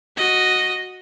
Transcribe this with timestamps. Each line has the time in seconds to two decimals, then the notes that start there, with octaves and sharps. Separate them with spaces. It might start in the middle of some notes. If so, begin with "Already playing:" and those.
0.17 F#4 D#5